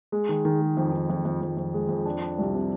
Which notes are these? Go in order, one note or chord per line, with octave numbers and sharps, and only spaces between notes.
G#3
D#3
D#3
G#3
F2
D#3
F2
F2
F2
F2
G#3
F2
D4
D4
C2
C3